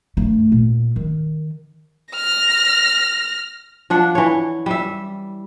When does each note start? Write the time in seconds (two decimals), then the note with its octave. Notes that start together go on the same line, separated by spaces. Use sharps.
0.17 G2 A3
0.52 A#2
0.96 D#3
2.14 F6 A#6
3.90 F3 D4 F#5
4.15 E3 C#5
4.66 G3 E5